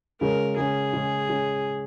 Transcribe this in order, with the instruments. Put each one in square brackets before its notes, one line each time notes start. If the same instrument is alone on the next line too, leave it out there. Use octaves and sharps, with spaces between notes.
[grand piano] C#3 G#3 C#4 [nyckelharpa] A#4
[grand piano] C#3 G#3 C#4 [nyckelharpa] G#4
[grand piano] C#3 G#3 C#4
C#3 G#3 C#4